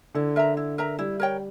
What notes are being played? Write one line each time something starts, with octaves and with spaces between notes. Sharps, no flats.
D3 E4
A#4 E5 A#5
E4
A#4 E5 A#5
G3 E4
A#4 C#5 G5